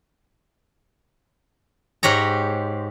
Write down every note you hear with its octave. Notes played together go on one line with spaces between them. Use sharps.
G#2 G4 C#5 A#5